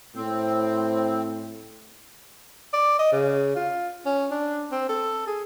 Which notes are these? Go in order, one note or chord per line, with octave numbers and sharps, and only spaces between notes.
A2 C4
D5
D#5
C#3
F4
C#4
D4
C4
A4
G#4